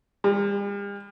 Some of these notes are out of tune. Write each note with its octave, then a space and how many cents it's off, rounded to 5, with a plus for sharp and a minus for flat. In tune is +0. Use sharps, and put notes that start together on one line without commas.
G3 +45